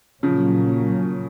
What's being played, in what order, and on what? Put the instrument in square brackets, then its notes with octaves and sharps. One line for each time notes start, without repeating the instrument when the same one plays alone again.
[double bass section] A#2 F#3 A#3 C#4 [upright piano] C#3 F3